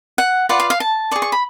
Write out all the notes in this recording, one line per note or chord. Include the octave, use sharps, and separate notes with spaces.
F#5
F4 B4 D5 F#5
F5
F5
A5
G#4 D5 C#6
C#6
B5